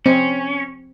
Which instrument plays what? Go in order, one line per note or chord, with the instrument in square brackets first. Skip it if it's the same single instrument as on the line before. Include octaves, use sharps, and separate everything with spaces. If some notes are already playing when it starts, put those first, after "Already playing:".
[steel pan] C4 [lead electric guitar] C#4